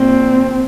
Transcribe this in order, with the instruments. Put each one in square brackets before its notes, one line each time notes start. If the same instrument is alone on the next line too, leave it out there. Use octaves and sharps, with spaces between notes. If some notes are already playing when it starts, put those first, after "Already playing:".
Already playing: [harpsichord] A#1 A#2 [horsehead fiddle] C4